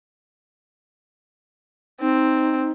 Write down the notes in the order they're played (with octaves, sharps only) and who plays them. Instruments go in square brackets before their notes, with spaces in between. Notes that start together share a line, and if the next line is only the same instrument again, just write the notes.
[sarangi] C4 [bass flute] D#4